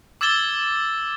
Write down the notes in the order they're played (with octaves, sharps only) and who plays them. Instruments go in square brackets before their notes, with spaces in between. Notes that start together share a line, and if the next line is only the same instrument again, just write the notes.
[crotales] D6 E6 G#6 A6 E7 G7